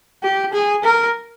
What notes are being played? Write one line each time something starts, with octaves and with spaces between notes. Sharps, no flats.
G4
G#4
A#4